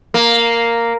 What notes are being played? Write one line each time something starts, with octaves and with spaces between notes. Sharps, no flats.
A#3